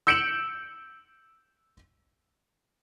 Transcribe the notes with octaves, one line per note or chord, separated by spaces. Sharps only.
E6 G6 C#7 D7 E7 F#7